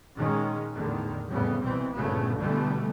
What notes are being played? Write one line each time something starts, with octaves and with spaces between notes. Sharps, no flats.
A#2 D#3 G#3 C#4
E2 A2 D3 D#3
F2 A2 C#3 G3 B3
C2 B2 E3 C4
G1 A#2 C#3 A3 B3
B2 D3 E3 G3 A3 B3